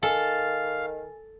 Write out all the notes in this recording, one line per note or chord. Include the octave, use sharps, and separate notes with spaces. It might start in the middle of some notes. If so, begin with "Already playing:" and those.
D#3 A4 F5 G#5